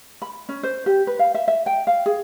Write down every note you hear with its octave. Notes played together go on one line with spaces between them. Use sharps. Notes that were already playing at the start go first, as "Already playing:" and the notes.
B5
C#4
C5
G4
B4
F5
E5
E5
G5
F5
G#4